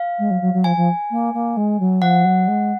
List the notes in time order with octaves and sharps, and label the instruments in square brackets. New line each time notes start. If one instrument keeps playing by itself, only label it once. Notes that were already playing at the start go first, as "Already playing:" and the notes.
Already playing: [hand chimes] F5
[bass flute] G#3
F#3
F#3
F#3
[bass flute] F3 [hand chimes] G#5
[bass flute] F3
A#3
A#3
G#3
F#3
[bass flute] F3 [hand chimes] F#5
[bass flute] F#3
G#3